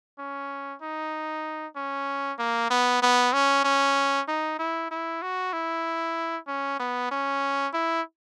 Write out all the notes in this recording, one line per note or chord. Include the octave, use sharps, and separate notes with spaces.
C#4
D#4
C#4
A#3
B3
B3
C#4
C#4
D#4
E4
E4
F#4
E4
C#4
B3
C#4
E4